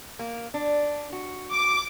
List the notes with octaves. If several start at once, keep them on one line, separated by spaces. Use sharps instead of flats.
A#3
D4
F#4
D6